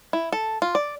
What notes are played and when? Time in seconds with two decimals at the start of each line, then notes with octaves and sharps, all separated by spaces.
0.13 E4
0.32 A4
0.62 F4
0.75 D5